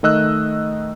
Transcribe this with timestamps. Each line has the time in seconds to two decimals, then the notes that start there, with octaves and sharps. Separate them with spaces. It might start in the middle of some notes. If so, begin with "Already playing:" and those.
0.03 D#3 A3 D#5 E6 F#6